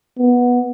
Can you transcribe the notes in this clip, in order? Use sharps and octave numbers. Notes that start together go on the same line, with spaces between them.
B3